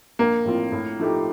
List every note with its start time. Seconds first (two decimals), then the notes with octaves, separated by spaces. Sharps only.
0.19 A#1 A#3
0.45 A2 F3 C4 F4
0.72 A2
0.99 F3 A3 D#4 G4